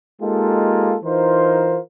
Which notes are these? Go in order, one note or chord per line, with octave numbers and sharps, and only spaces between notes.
G#3 A#3 D#4 F4 G4 A4
E3 D#4 F4 A#4 C5